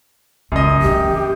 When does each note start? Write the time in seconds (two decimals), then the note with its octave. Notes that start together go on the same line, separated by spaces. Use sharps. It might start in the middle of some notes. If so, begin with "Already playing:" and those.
0.52 C#2 F#2 D#5
0.82 G#1 D4 G4
1.04 E3